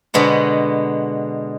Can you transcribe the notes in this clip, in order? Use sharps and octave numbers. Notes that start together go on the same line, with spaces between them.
B2 D3 G#3 B3